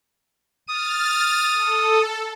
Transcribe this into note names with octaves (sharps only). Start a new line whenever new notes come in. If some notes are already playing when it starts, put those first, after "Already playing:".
D#6 F6 A6
A4